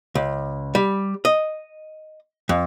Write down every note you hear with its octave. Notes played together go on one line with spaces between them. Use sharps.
C#2
G3
D#5
F2